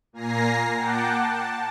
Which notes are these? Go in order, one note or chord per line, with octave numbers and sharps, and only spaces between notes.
A#2 A#3 G#5 A#5 A#6 C7
F#5 G5 A5 D6
A5